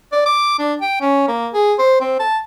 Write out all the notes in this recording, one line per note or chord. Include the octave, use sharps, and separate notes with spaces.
D5
D6
D4
G5
C#4
A#3
G#4
C5
C4
A5